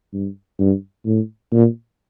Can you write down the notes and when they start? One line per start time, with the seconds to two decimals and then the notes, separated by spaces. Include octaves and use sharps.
0.13 G2
0.59 G2
1.06 A2
1.52 A#2